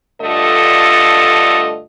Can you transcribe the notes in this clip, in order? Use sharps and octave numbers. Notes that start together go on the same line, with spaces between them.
G2 D3 A3 F4 A4 D#5